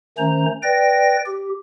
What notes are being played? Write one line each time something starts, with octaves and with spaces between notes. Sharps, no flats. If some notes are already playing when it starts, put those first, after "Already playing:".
D#3 A3 C#4 C5 A#5
B4 D5 G5 A#6
G4